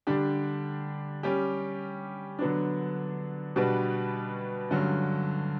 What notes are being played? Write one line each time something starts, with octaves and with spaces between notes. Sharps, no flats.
D3 G3 D4 G4
G3 C#4 G4
D3 F#3 B3 D4
B2 G3 D4 F#4 B4
G2 D3 F#3 C#4